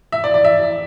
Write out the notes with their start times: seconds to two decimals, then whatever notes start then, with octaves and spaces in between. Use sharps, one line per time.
0.12 E5
0.24 D5
0.34 D5
0.44 E5